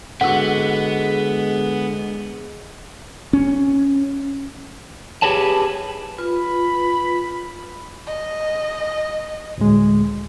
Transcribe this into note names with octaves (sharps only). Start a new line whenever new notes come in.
D3 G#3 B3 F#4 F#5 E6
C#4
G4 G#4 B4 C#5 A5
F4 B4 B5
D#5
D2 A2 G#3